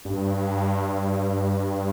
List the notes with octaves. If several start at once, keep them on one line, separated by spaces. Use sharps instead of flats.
G2